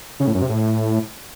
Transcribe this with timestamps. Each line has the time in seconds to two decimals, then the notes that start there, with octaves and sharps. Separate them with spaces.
0.20 C#3
0.27 A2
0.35 F#2
0.42 C3
0.49 A2